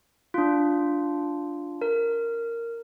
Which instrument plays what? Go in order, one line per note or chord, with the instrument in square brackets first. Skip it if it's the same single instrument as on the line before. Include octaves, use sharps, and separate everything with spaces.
[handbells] D4 F4
A#4